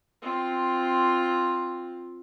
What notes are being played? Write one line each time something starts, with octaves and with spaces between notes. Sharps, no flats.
C4 F4